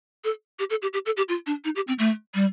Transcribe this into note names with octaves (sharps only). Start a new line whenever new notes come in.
A4
G4
A4
G4
G4
A4
G4
F4
D4
D#4
G4
C4
A3
G3